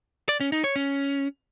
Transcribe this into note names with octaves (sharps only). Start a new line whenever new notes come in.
D5
C#4
D#4
C#5
C#4